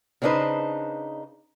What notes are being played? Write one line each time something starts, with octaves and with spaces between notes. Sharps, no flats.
C#3 C4 D4 D#4 B4 C5